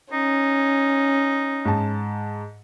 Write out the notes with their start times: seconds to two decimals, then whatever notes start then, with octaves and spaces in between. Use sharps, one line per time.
0.13 C#4 D#4
1.65 G#2 A5